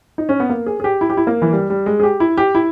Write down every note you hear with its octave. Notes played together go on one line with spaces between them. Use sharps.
D#4
C#4
B3
A#3
G#4
G#4
G4
E4
G4
E4
A#3
E3
G3
G3
G#3
G#4
G4
E4
G4
E4